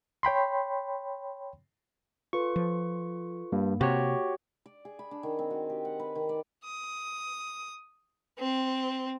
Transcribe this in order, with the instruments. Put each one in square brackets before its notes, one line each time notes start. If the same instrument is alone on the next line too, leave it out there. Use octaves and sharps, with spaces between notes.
[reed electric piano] C#5 G5 B5 C6
[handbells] F4 A4 B4 [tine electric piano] C#6
[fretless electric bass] F3
[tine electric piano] G2 [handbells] A#3
[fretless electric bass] C3 [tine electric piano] F#4 G4 C#5
[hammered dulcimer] D5
G#4
B5
D4
D#3
C4
F#4
G4
F#5
B4
D#3
D5
[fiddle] D#6
C4